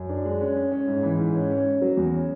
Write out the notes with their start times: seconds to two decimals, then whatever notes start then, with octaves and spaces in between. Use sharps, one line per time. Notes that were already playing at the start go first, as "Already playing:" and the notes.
Already playing: F#2
0.09 D4
0.25 G#3
0.41 C#4
0.56 C#4
0.72 C#4
0.87 G#2
1.03 E3
1.18 G#2
1.35 C#4
1.50 C#4
1.66 C#4
1.82 F#3
1.97 E2
2.13 C#4